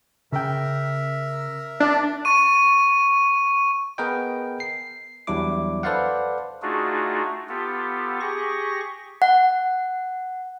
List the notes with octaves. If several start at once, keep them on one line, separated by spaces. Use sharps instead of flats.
C#3 A#4 E5 G5
D4
C#6 D#7
B3 G#4 A#4 B4 D#5 G5
C7
E2 F#3 G3 D4 E4 D6
A4 B4 C5 D5 F5 F#5
A3 D4 D#4 F4 F#4 G#4
B3 F4 G4 A4
G4 G#4 C#6 A#6
F#5